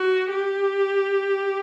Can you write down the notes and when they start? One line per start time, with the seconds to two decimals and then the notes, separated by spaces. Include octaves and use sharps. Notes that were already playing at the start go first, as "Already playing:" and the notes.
Already playing: F#4
0.31 G4